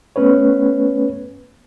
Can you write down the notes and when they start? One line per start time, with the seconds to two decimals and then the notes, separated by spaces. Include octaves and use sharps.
0.16 A3 B3 C#4 B4 C#5